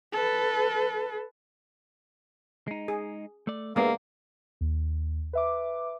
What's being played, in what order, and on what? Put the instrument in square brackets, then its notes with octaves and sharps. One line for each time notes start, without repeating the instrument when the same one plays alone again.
[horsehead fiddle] A4 B4
[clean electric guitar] G#3 D#4
[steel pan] G#4
[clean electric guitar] A3 D5
[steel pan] G#3 B3 D5 [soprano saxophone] A#3 [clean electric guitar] D4 G4 E5
[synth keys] D#2
B4 E5 D6